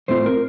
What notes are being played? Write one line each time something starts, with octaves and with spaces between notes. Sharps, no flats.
A2 A3 C4 F4 C5
A#4